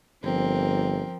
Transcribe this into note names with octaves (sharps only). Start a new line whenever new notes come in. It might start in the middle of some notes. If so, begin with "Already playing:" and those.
G1 F3 C4 A#4